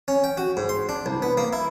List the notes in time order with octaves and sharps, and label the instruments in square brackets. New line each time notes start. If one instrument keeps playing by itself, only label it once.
[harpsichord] C#4
G5
F#4
G#2
C6
D4
C2
B3
A#3
E4